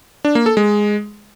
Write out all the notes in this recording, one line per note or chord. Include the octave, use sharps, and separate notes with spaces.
D4
A#3
A4
G#3